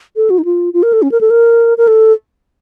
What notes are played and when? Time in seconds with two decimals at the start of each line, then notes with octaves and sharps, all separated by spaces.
0.16 A4
0.30 F#4
0.38 D#4
0.45 F4
0.74 F4
0.83 A#4
0.93 A4
1.02 C#4
1.12 A#4
1.21 A4
1.30 A#4
1.78 A#4
1.88 A4